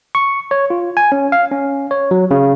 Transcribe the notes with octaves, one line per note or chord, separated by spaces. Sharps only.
C#6
C#5
F4
G#5
C#4
F5
C#4
C#5
F#3
C#3